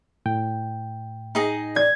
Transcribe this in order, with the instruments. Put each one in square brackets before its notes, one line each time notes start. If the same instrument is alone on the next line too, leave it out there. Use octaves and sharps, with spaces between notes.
[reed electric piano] A2 G5
[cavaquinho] D#4 G#4 D#5
[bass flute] D5 [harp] G#6